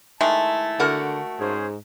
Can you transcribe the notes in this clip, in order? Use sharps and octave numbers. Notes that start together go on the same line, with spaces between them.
D#3 G#3 A3 E4 A5
D3 F#4 A#4 F#5
G#2 C#4 G#4 C5